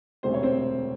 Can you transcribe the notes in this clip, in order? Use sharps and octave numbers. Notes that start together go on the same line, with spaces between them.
E1 D2 C3 C5
C#5
C4 C5